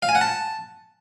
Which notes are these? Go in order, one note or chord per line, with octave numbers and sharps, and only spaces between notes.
F5
G#5
F#5
A5